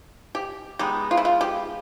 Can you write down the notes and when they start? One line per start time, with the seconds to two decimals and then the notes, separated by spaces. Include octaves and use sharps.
0.35 G4
0.79 G#3 B3 D#4 G4
1.11 F4
1.17 E4
1.25 F4
1.41 G4